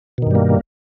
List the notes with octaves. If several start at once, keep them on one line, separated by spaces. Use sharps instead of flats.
G2 B2 D#3 G3 A#3